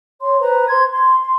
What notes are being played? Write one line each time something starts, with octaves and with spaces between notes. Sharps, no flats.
C#5 C6
B4 C5 A#5
C5 C6 G#6
C6
C6